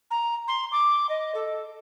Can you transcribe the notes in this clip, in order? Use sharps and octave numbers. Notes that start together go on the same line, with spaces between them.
A#5
C6
D6
D#5
A4